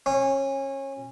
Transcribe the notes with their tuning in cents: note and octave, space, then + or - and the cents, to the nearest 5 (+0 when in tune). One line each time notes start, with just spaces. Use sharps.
C#4 -25